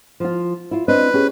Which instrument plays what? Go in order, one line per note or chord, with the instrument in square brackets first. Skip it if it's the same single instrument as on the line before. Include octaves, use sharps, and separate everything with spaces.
[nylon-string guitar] F3 F4
E4 F4
[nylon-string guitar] C4 D4 D#5 [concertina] B4
[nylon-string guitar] C#4 G4 G#4